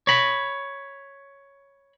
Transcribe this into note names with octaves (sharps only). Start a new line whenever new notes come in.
C#5 B5